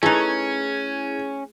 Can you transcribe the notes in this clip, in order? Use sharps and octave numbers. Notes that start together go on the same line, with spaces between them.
A3 C#4 D#4 E4 G#4 B4 F#6